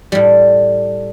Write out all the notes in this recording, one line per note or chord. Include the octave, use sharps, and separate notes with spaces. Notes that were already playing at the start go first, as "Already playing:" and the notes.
A2 G3